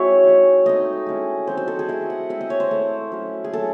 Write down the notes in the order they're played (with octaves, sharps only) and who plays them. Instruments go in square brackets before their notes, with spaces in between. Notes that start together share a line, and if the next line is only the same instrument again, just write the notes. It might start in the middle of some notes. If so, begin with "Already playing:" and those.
Already playing: [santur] G#3 C4 E4 F#4 C#5 E5
G#3 D#4
A3 C4 D#4 D#5
G#3 C#4 E4
F#3 C4 D#4 C5
C5
A4
G#4
A3 C4 E4 D#5
F#5
G#3 C4 E4 E5
D#5
C#5
C5
A3 C4 E4
F#3 C#4 E4
G#4
F#3 A3 C#4 E4 A4